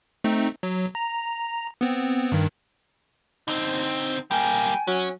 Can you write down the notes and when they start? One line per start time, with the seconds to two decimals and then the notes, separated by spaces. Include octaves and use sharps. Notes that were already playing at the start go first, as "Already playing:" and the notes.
0.24 A3 C4 D#4
0.63 F#3
0.95 A#5
1.81 B3 C4
2.32 G2 D#3
3.48 D3 C4 D#4
4.31 G3 A#3 G5 G#5
4.87 F#3 C#4